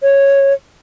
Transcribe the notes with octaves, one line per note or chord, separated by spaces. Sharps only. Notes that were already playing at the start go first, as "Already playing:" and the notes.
C#5